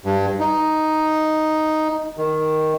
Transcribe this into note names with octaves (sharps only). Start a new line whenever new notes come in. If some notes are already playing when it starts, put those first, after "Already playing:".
G2
D#4
D#3